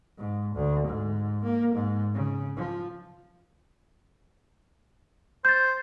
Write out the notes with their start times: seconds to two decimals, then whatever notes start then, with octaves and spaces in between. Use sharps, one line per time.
0.17 G#2
0.55 D2
0.88 G#2
1.43 A#3
1.74 G#2
2.14 C#3
2.57 F3
5.45 C5 G6 A6